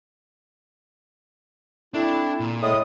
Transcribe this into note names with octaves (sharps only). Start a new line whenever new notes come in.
A3 C4 D4 E4
A#2
A2 G#3 D#6